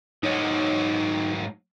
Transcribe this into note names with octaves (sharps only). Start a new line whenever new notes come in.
G#2 F#3 D#4 C#5